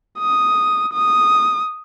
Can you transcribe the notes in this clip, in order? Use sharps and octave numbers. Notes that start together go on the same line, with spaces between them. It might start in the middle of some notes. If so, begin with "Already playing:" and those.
D#6
D#6